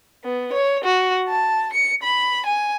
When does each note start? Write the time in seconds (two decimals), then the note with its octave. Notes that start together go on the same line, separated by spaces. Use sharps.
0.24 B3
0.53 C#5
0.84 F#4
1.28 A5
1.73 C#7
2.03 B5
2.46 G#5